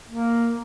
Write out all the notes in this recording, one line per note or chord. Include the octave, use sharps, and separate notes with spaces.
A#3